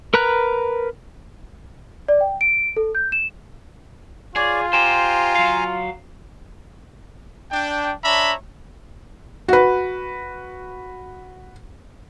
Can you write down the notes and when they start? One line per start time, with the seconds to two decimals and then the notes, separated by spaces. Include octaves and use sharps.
0.14 A#4 B4 A#5 F#6
2.08 D5
2.21 G5
2.41 D7
2.77 A4
2.95 G6
3.12 E7
4.36 F4 G#4 C#5 D5
4.73 G4 C5 G#5 A#5 C6
5.35 F#3 F5
7.51 D4 G5
8.04 D4 C#5 E5 A#5 B5
9.48 F#4 B4